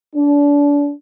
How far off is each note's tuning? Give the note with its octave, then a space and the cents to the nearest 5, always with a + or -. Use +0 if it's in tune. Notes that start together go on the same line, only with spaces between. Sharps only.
D4 -30